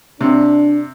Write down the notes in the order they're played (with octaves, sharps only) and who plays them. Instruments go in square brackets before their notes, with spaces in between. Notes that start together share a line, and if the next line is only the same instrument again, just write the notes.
[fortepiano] C3 [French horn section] D4